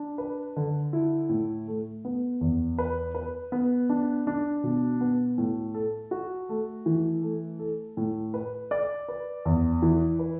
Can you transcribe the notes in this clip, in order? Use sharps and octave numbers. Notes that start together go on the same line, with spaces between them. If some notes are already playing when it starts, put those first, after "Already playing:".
Already playing: D4
B4
D3
E4
A2
A3
B3
E2
B4
B4
B3
D4
D4
B2
B3
A2
A4
F#4
A3
E3
A3
A4
A2
B4
D5
B4
E2
E3
B4